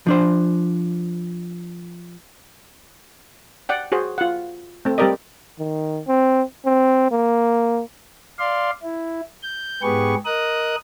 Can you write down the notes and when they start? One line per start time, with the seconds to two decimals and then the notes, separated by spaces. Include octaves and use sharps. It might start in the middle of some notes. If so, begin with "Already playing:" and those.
0.06 F3 D4 C5
3.69 D5 F#5 G5
3.92 F#4 G#4 C5
4.18 F4 F#5
4.85 A3 C4
4.98 G3 C4 G4 A#4 D5 D#5
5.59 D#3
6.07 C4
6.65 C4
7.11 A#3
8.39 D5 F5 C6
8.83 E4
9.42 G6
9.83 G#2 B3 G4 G#4 B4 C#6
10.25 A#4 D#5 D#6 F#6